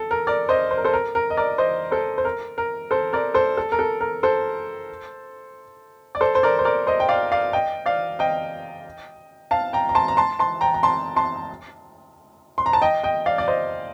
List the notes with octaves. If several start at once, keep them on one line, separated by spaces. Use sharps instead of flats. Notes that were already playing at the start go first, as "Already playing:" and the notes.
Already playing: A4
A#4
A#4 D5
C5 D#5
C5
A#4
A4 C5
A#4
A#4
D#5
A#4 D5
C5 D#5
A4 C5
C5
A#4
A#4
A4 C5
A#4 D5
A4 C5
A4
A#4
A4
A#4
A4 C5
D5
A4 C5
C5
A#4 D5
C5
A#4 D5
C5 D#5
G5
D5 F5
D5 F5
D#5 G5
D5 F5
D#5 G5
F5 A5
G5 A#5
A#5
A5 C6
A#5
A5 C6
A5 C6
G5 A#5
A#5
A5 C6
A5 C6
C6
A#5
A5
D#5 G5
D#5 G5
D5 F5
D5
C5 D#5